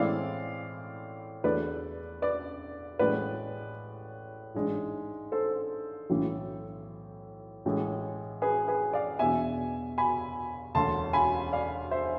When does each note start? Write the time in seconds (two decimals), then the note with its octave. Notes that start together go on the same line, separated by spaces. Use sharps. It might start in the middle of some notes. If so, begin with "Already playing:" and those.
Already playing: A2 E3 G#3 C4 E4 D5 F5
1.44 E2 D3 A3 D4 B4 D5
2.22 B4 D5
2.99 A1 A2 G#3 B4 D5
4.55 A1 G#2 G#3 D4
5.32 A4 C5
6.10 B1 A2 E3
7.65 A1 A2 E3 G#3
8.42 G#4 B4
8.68 G#4 B4
8.93 D5 F5
9.19 E2 B2 B3 D4 E5 G#5
9.98 G#5 B5
10.75 E1 D2 D3 A5 C6
11.13 G#5 B5
11.53 D5 F5
11.91 C5 E5